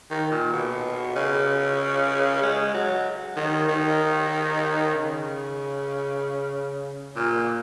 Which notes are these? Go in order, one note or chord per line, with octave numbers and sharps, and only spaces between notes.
D#3
A#2
B2
C#3
G#3
F#3
D#3
D#3
C#3
A#2